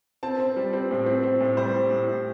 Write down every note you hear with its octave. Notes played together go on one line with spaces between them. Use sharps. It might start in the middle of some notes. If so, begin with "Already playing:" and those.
C4 A5
C4
G3
C4
A2
C4
C4
A2
G3 C5
G3
A2
A2